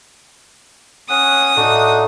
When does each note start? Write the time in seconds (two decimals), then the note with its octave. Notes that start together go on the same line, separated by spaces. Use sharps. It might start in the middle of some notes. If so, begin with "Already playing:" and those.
1.10 C#4 F#5 D#6
1.56 A2 D4 D#4 F#4